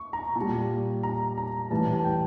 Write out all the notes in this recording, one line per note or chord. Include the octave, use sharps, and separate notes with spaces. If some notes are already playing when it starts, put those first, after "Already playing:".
Already playing: C#6
A#5
A#2 A5
G3
A#5
A#5
A2 E3 G3 A5
A5
G5